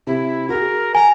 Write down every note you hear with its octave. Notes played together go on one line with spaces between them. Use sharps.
C3 E4
F#4 G#4 A#4
G#5 A#5